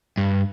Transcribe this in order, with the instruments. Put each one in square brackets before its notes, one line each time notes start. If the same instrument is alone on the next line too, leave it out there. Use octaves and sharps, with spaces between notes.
[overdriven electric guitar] G2